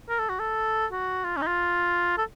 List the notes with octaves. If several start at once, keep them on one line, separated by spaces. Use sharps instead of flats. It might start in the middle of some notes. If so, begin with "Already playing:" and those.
A#4
A4
F#4
A4
F#4
F4
C#4
D#4
F4
A4